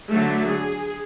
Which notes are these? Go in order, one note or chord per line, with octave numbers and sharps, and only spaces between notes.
D3 F#3 A3
G#4